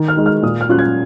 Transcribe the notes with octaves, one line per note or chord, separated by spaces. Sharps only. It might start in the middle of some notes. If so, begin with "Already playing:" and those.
Already playing: D#3
F6
G#3 D#4
F6
A#2 D#6
F6
F#3 C#4 F4 F#6
G#6